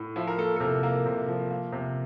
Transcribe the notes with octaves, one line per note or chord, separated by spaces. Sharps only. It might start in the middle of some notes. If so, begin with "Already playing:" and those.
Already playing: A2
F3 E4
A#4
A#3 A4
A4
C3 A#4
A#3 A#4
C3
F3
A#3
C3